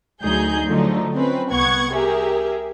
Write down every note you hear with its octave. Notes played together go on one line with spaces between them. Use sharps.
D2 F#3 D#4 G#4 G6
D3 F3 F#3 A3 D#4
C4 C#4 B4
C2 B3 F#5 C#6 G#6
G4 G#4 A#4 E5